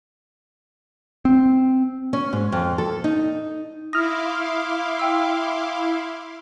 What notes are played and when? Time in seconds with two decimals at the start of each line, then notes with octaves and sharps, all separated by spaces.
1.25 C4
2.13 C#4
2.33 G#2
2.52 F2
2.78 A4
3.04 D#4
3.93 E4 F5 C6 D6 D#6 F6 A#6
4.99 E5 G5 E6